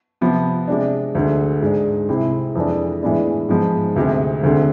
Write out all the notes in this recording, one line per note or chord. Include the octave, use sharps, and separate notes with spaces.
C3 F3 B3
C3 G#3 D4
D2 D3 G#3
G#2 G#3 D4
C2 C3 G#3 C4 E4
F2 E3 G#3 D4
A2 E3 G#3 B3 D4
G#2 F3 G#3 B3
D2 C3 G#3
D2 D3 G#3 C4